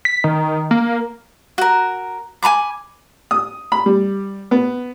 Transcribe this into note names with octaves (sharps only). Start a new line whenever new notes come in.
B6
D#3
A#3
F#4 A#4
G#5 A#5 B5 D6
D#6
B5
G3
B3